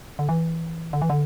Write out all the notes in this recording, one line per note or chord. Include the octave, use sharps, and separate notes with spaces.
D3
E3
D3
E3
D3